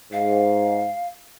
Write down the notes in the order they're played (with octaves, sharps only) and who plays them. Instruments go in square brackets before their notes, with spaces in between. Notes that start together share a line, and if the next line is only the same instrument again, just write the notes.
[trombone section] G#2 [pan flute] F5